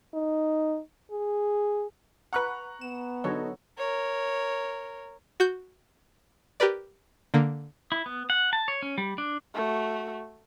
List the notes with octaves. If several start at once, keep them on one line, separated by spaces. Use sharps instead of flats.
D#4
G#4
B4 F#5 A#5 C#6 F#6
B3 E7
D3 F#3 D#4 F#4 A4 C#5
A#4 C#5
F#4 G6
G4 A#4 B4 D5
D3 A#3
E4
B3
F#5
A5
C#5
C#4
G3
D4
A3 F#4